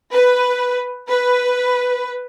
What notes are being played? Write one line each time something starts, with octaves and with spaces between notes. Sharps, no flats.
B4
B4